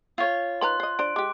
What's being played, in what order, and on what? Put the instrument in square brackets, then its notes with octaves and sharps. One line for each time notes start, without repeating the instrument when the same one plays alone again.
[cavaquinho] F4 C#5
[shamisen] D#3 B4 A#5 [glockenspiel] C6 F#6
[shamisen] C5 D#5
[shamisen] D4 C5 [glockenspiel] D7
[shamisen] G#3 G4 [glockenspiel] D6